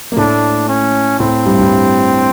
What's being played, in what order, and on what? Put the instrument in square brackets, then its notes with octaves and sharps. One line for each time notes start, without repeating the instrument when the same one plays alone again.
[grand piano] A#3
[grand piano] A2 A3 [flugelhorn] D4
[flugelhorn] C#4
[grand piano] A2 A3 [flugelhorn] C4
[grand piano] G2 G3
G2 G3